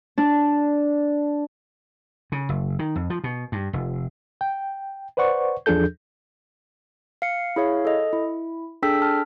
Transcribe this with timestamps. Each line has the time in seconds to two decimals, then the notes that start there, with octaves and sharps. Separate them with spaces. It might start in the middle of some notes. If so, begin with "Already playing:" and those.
0.18 D4
2.32 C#3
2.49 F#1
2.79 D#3
2.96 F2
3.10 F3
3.24 B2
3.52 G2
3.73 F1
4.41 G5
5.17 B4 C5 D5 F#5 C#6
5.66 E2 F3 D4 G#4 A4 G6
7.22 F5 C#7
7.56 E4 G#4 C#5 F5
7.85 A4 D#5
8.13 E4
8.83 D4 G#4 A4 G5 E6 B6
9.02 A5 F6